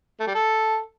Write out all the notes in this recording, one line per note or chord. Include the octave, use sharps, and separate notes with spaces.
A3
G3
A4